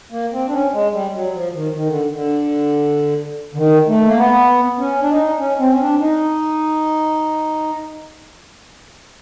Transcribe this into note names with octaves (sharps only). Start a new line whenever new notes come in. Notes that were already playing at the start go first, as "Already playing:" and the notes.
A#3
C4
D4
C#4
G#3
G3
F#3
F3
D#3
D#3
D3
D3
D3
D#3
A3
A#3
B3
C#4
D4
D#4
C#4
C4
C#4
D4
D#4